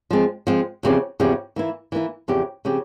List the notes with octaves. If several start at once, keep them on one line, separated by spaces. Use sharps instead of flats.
F3 G#3 C4
F3 G#3 C4
E2 C#3 F3 C4 G4
E2 C#3 F3 C4 G4
E3 A#3 E4
E3 A#3 E4
E2 C#3 F3 C4 G4
C#3 F3 C4 G4